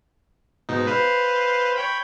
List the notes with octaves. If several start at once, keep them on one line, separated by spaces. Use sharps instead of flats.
G#2 B2 D#4
B4 C5 F5
C#5 G5 B5